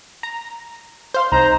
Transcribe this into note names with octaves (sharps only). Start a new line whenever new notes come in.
A#5
C5 F5 C6
C2 D#4 C5 A#5